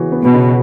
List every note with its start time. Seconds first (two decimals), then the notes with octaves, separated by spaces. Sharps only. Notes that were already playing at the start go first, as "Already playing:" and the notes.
Already playing: C#3 E3 B3 F#4
0.12 B3
0.23 B2
0.34 C#3